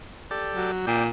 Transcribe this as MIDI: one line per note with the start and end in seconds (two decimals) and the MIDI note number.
0.31 0.71 67
0.31 0.71 69
0.31 0.71 74
0.55 0.85 54
0.87 1.09 46
0.87 1.04 74
0.87 1.04 79